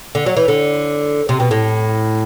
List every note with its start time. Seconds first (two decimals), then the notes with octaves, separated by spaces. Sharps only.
0.15 D3
0.26 F#3
0.37 E3
0.48 D3
1.29 C3
1.40 B2
1.51 A2